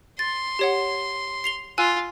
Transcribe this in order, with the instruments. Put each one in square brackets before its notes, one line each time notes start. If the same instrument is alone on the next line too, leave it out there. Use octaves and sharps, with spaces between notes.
[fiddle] C6 [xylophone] A6
[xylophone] G4 C#5 F#5
C7 F7 G7
[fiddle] F4 [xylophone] G#5 E6 F#6